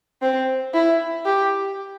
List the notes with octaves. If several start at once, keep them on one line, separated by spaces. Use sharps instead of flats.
C4
E4
G4